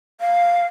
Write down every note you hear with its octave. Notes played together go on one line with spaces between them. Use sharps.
F5